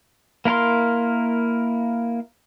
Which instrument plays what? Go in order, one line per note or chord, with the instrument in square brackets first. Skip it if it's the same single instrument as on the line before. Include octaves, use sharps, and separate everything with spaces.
[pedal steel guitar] A#3 E4 A#4 F5 C6